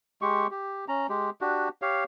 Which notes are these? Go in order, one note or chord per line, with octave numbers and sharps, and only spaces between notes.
G#3 G4 C#6
G4
C#4 A#5
G#3 G4
D4 F#4 G4
G4 C#5 F5